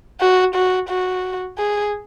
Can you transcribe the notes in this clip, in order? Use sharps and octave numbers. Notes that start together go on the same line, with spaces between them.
F#4
F#4
F#4
G#4